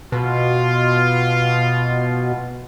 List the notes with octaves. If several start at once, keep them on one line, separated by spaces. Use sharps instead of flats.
B2 F4